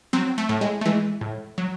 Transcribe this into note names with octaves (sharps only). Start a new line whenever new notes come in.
F#3 C4
A3
A2
G#3
A3
E3 G#3
A2
F#3